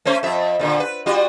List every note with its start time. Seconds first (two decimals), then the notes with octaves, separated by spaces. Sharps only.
0.05 A3 C#4 C5
0.23 F2 E5
0.59 F2 A#2 D3
0.80 B4
1.06 G3 F4 F#4